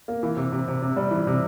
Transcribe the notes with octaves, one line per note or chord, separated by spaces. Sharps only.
A#3
E3
C3
C3
C3
C3
G3
E3
C3